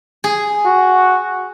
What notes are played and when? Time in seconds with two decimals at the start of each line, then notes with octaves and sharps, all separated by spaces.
0.24 G#4
0.65 F#4